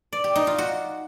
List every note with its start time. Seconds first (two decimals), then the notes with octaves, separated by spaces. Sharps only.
0.13 D5
0.24 G4
0.35 D#4
0.47 F4
0.58 F#4